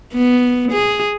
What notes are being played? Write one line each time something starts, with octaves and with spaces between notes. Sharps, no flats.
B3
G#4